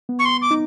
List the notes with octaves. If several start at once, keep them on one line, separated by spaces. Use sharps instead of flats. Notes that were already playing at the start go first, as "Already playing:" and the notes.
B3
C#6
C6
D6
D#4